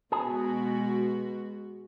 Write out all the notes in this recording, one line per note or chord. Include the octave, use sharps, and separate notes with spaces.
B2 G#3 F#4 G#4